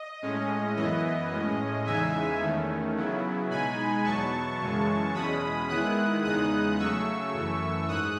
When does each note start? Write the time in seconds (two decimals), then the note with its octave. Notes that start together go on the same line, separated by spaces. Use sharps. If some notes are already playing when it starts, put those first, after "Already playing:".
Already playing: D#5
0.22 A2 G#3 C#4
0.76 F#2 E3 B3 E4 D#5
1.31 A2 G#3 C#4
1.86 E2 C#3 E3 G#3 D#4 E5 G#5
2.41 E2 D#3 A3 C#4
2.96 C#3 F#3 B3 E4
3.51 B2 G#3 D#4 G#5 B5
4.04 E2 B2 F#3 B3 A5 C#6
4.60 F#2 C#3 E3 G#3
5.14 E2 B2 G#3 C#4 B5 D#6
5.69 D#3 G#3 B3 E4 D#6 F#6
6.24 E2 C#3 G#3 B3 D#4 D#6 F#6
6.79 C#3 F#3 A3 C#6 E6
7.34 F#2 E3 A3
7.88 G#2 D#6 F#6